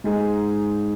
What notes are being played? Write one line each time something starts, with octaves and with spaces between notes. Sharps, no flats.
G#2 G#3 D#4 G#4